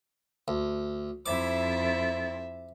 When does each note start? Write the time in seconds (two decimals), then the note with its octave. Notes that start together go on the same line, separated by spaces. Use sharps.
0.48 D2
1.26 F2 E4 C5 E5 D6 A6